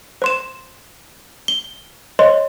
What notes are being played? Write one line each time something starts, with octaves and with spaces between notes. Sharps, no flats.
C5 C6 E7
G7
C5 C#5 D#5 C6